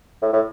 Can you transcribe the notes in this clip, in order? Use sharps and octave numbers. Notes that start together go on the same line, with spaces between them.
A2
A2